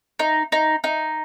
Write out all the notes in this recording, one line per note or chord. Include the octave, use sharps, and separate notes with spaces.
D#4
D#4
D#4